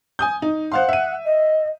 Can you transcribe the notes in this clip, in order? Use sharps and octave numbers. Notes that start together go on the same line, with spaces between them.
G#5 D#6 G6
D#4
C5 F5 F#5 C6
E5 D#7
D#5